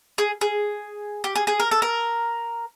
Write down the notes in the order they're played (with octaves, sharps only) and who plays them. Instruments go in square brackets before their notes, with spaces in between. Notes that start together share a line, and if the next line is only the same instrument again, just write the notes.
[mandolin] G#4
G#4
G4
G#4
G#4
A#4
A4
A#4